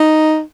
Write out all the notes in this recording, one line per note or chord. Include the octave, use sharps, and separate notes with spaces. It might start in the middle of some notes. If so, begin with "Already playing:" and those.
Already playing: D#4